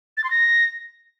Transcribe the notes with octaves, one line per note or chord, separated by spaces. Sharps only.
A6
C6
A#6